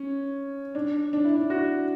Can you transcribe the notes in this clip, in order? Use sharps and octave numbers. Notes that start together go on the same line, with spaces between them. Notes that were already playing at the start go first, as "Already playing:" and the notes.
Already playing: C#4
D4
D4
E4
D4
F#4